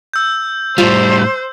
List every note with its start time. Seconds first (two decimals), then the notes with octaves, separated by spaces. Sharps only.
0.14 E6 G6
0.78 A2 G3 F4 C5